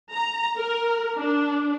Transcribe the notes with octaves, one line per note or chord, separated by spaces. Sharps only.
A#5
A#4
D4